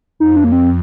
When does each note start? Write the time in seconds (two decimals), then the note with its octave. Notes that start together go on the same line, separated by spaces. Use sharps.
0.19 F2 D#4
0.36 D4
0.44 A#3
0.52 C4